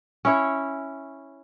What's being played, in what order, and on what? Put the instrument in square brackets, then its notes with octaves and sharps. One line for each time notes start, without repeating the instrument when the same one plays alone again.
[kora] C#4 E4 C#5